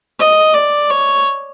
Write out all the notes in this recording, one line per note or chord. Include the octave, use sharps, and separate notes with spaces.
D#5
D5
C#5